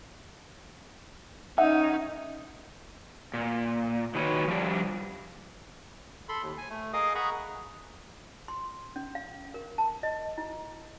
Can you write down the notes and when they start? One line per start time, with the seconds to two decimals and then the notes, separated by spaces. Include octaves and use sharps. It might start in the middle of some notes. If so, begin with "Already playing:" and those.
1.58 C#4 D#4 E5 F#5
3.34 A#2
4.15 D#3 F#4 B4 C#5
4.48 F3 G3 D4
6.29 A4 B5 C6
6.43 D#2
6.58 G#5
6.70 A3
6.93 G#4 A#4 D#5 F5 D#6
7.15 G#4 F#5 A#5 B5 C#6
8.48 C6
8.96 C#4
9.15 F5
9.54 A#4
9.78 A5
10.03 D#5
10.38 E4